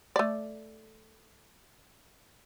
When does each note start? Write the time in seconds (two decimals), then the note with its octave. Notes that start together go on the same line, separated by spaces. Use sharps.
0.16 A3 D5